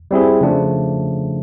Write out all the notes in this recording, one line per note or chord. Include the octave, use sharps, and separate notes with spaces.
G3 C4 E4 G#4
C#3 F3 A3 D4